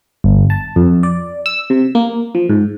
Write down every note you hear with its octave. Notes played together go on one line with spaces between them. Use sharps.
G1
A5
F2
D5
E6
C3
A#3
F3
G#2